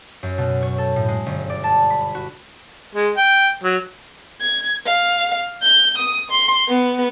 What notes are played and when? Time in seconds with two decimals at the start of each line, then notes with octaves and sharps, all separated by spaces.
0.23 F#2
0.38 B2
0.62 C#5
0.78 A4
0.96 A2
1.08 G#3
1.26 G1
1.50 D5
1.64 A5
1.90 B5
2.15 F#4
2.95 G#3
3.17 G5
3.64 F#3
4.41 G#6
4.86 F5
5.63 G6
5.98 D#6
6.31 C6
6.69 B3